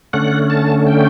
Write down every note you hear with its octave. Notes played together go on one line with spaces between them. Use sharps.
D3 A3 C#4 F#5
A5
G5